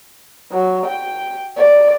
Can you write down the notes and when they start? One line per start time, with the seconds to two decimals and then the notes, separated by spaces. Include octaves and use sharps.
0.51 F#3
0.86 G5
1.57 D5